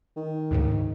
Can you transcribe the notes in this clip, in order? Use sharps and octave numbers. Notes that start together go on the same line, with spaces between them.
D#3
D2 G#2 C#3